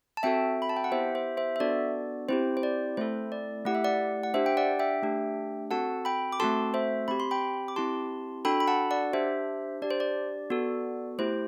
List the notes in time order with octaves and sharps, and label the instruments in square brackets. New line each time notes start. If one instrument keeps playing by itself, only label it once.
[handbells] A5
C4 F#4 A4 E5 G5
B5
A5
G5
F#5
B3 E4 G4 C5 E5
C5 E5
C5 E5
E5
B3 D4 F#4 A4 D5
C4 E4 G4 C5
C5
D5
A3 C4 E4 A4 C5
D5
A3 E4 G4 F#5
E5
D5 F#5
F#5
D4 G4 C5 E5
G5
D5 F#5
E5 G5
A3 D4 G4
C4 F#4 A4 F#5 A5
G5 B5
D6
A3 C4 F#4 A4 A5 C6
C5 E5
C4 G4 B5
C6
G5 B5
D6
C4 E4 G4 A5 C6
D4 F#4 A4 G5 B5
B5
F#5 A5
D5 F#5
D4 G4 C5 E5
D4 G4 D5
C5
D5
B3 F#4 A4
A3 E4 G4 C5